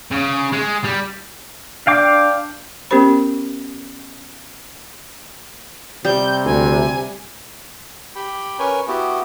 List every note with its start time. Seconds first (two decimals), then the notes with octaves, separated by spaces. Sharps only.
0.11 C#3
0.52 G#3
0.84 G3
1.87 D4 F5 G5 D6
2.91 B3 C#4 G4 A#4 C5 B5
6.04 C3 G3 G6
6.45 D2 G#5
8.16 G4 G5 B5
8.59 C#4 A#4 B4 C#5 G#5
8.88 B3 E4 F#4 G4